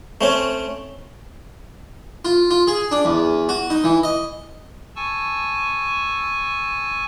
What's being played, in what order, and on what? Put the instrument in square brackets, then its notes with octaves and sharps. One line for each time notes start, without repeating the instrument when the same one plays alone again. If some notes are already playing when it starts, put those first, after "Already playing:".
[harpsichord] A3 C4 C#4
F4
F4
G#4
D4
E2
F#4
D#4
E3
D#5
[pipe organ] G#5 A5 C#6 E6